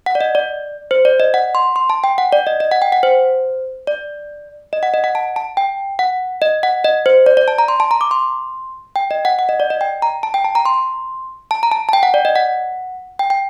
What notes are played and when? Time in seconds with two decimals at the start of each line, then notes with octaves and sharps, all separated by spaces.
0.06 F#5
0.15 D5
0.21 D#5
0.35 D5
0.91 C5
1.05 D5
1.20 D#5
1.34 F#5
1.55 C6
1.76 C6
1.90 A5
2.04 G5
2.18 F#5
2.32 D5
2.47 D#5
2.60 D#5
2.71 F#5
2.82 G5
2.92 F#5
3.03 C5
3.87 D5
4.73 D#5
4.83 F#5
4.94 D#5
5.04 F#5
5.15 A5
5.36 A5
5.57 G5
5.99 F#5
6.42 D#5
6.63 F#5
6.85 D#5
7.06 C5
7.26 D5
7.37 D5
7.48 A5
7.58 A#5
7.68 C6
7.80 A5
7.91 A#5
8.01 D6
8.11 C6
8.96 G5
9.11 D#5
9.25 F#5
9.39 F#5
9.49 D#5
9.60 D5
9.70 D#5
9.81 G5
10.02 A#5
10.23 A5
10.34 G5
10.44 A5
10.55 A#5
10.65 C6
11.51 A5
11.63 A#5
11.72 A5
11.89 A5
11.93 G5
12.03 F#5
12.14 D5
12.25 D#5
12.35 F#5
13.19 G5
13.30 G5